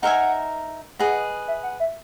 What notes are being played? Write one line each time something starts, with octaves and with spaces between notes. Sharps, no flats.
D#4 A#4 E5 F#5 G#5
G#4 B4 D#5 F#5
E5
F#5
E5